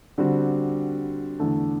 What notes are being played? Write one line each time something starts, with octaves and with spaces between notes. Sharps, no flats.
D3 G3 C4 F#4
E2 D3 A3